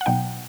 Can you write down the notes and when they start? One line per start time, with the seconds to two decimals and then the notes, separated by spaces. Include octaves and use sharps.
0.01 F#5
0.06 B2 F#3 B3 D#4 G5